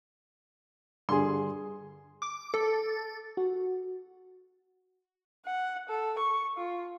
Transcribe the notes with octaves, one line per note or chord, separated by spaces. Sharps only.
G2 D3 G#4 C6
D6
A4
F#4
F#5
A4
C#6
F4